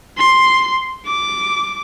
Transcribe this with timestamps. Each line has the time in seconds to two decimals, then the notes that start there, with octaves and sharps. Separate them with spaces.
0.18 C6
1.07 D6